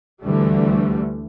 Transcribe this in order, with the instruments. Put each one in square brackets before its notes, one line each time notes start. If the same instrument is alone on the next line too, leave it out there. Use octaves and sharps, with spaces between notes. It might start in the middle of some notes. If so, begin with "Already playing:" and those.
[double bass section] D2 D3 E3 G3 A3